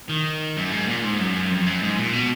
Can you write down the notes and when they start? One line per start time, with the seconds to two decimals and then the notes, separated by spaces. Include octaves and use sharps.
0.09 D#3
0.57 F#2
0.72 G#2
0.88 A#2
1.04 G#2
1.19 F#2
1.50 F2
1.66 F#2
1.82 G#2
1.98 A#2
2.13 B2